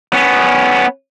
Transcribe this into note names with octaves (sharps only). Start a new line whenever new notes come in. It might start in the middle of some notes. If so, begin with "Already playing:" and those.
B3 C#4